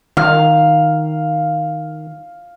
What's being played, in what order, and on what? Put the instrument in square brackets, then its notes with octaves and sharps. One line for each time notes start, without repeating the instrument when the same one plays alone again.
[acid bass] D#3 [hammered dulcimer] F5